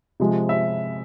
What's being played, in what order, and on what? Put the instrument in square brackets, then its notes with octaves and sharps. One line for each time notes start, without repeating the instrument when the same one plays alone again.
[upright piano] C3 F3 G#3
E5